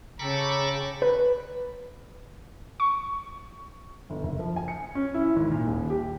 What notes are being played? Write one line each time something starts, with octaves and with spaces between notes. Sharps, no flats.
C#3 A4 G5 A#5 B5 C#6 D6
B4
C#6
G1
F#1
F3
G#5
C#7
C#4
E4
G#1
A#2
D#1
G4